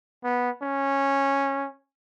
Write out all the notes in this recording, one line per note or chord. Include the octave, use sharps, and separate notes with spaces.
B3
C#4